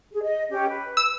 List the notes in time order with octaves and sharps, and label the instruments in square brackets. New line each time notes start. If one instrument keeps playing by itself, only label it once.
[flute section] G#4
D#5
C#4 G4
B4
[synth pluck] E6